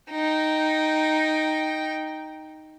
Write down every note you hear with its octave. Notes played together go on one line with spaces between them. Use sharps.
D#4 G5